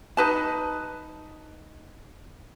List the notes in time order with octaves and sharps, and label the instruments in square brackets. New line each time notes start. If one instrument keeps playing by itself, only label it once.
[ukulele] D#4 B4 A5